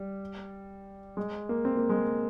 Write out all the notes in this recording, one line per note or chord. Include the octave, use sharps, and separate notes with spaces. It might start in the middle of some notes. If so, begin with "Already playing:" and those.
Already playing: G3
G#3
A#3
C4
A#3
G#3